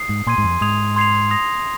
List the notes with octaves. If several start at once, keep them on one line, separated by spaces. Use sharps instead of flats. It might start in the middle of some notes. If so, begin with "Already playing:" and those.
Already playing: D#6 C7
G#2
A#2 G#5 C6 G#6 D#7
G#2
F2
G#2 D#6 G#6 F7
C6 G#6 C7 F7
D#6 A#6 F7